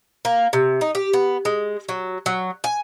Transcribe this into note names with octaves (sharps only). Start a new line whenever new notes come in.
A#3
C3
D#4
G4
B3
G#3
F#3
F#3
G#5